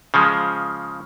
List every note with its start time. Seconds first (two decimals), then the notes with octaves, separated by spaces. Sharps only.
0.14 C#3 F3 G#3